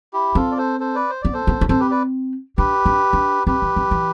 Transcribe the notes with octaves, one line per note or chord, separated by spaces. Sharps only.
E4 G4
C4 F4 A4
D5
A4 C5
A4 C5
B4 D5
C5
B3 D5
A4 C5
B3
D4
C4 A4 C5
G4 B4
B4 D5
D4 G4 B4
D4
D4
C4 G4 B4
E3
E3
E3